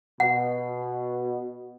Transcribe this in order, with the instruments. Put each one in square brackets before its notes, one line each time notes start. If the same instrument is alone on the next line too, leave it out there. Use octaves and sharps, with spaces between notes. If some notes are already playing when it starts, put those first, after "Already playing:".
[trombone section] B2 [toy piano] F#5